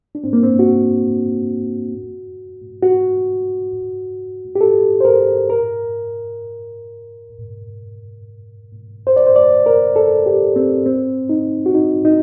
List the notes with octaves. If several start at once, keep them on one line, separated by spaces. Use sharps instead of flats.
D4
C4
A#3
C4
F#4
F#4
G4
A4
C5
A#4
A#4
C5
D5
C5
D5
A#4
A4
G4
C4
C4
D#4
F#4
D#4
D#4